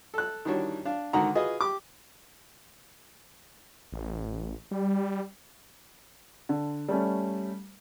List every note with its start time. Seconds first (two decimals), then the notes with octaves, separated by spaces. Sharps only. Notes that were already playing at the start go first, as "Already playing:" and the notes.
0.14 A4 F#6
0.45 D#3 E3 G3 D4 F#4 C#5
0.85 D4 F5
1.13 G#2 D3 D#3 F#4 F#5 A#5
1.35 F4 F#4 G#4 B4 D#5
1.61 G4 D6
3.92 A1
4.71 G3
6.49 D3
6.89 G3 A3 C#4